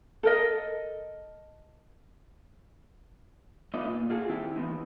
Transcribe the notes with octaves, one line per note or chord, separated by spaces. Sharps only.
A4 A#4 D#5
A3 B3 D#4 F4 D5 D#5
A#2
F4 F#4 G#4 A4
D#3 C4 E4 G4
E3 B3 C4 D#4